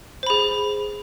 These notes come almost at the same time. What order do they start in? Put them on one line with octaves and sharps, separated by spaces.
C5 B5 G#4